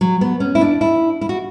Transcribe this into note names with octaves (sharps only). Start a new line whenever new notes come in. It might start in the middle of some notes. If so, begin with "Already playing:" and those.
F#3
B3
C#4
E4
D4
E4
E4
F#4